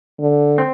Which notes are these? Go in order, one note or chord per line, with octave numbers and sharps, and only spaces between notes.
D3
C4